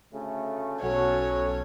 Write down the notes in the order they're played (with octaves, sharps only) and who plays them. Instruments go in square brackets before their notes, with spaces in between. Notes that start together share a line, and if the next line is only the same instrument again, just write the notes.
[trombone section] D2 C#3 A3
[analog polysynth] B1 A4 [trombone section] F#3 C#4 F#4 [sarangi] C#5